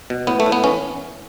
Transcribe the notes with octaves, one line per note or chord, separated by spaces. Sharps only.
B2
A2 B3
A3
A2
B3
E3 C#4